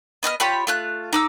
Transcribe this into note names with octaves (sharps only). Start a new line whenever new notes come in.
B3 D#5 G5 F6
F4 G4 C#5 B5
A3 F4 F#6
D#4 D6 E6